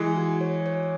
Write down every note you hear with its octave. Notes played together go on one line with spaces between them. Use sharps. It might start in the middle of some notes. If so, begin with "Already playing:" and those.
Already playing: E3 G#3
F#4
C#5
C#5